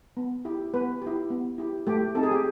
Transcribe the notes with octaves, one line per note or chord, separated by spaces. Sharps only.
B3
E4 G4
B3 B4
E4 G4
B3
E4 G4
A3 G4
C4 D#4 G4 A4
G#4
G4